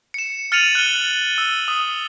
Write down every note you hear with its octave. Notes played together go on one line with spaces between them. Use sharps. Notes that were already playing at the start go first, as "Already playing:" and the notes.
C#7 E7
F6 A6 C#7 D#7 F7 F#7
F#6 G7
E6
D#6